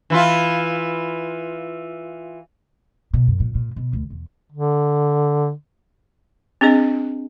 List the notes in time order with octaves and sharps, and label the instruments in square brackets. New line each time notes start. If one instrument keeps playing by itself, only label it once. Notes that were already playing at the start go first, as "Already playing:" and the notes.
[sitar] E3 E4 F4
[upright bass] B2
F#2
A#2
A#2
B2
D2
E2
[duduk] D3
[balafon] C4 D4 G#4 D#5